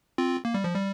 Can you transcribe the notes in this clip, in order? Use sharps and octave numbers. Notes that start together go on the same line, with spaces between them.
C4 F4
A#3
G3
F3
G3